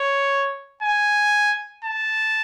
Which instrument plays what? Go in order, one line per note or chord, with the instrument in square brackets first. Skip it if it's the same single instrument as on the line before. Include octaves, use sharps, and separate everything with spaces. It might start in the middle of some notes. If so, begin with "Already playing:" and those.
Already playing: [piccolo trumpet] C#5
G#5
A5